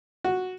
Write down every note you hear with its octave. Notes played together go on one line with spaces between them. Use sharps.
F#4